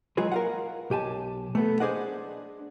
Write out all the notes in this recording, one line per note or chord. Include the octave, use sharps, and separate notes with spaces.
F#3 G#3 F4 G#4 B4
A#4 F5 F#5
B1 G4 G#5 A5
A3 B3 A4
D4 G#4 C5 D5 D#5 F#5